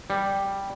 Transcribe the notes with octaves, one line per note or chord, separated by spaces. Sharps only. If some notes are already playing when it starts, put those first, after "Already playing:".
G3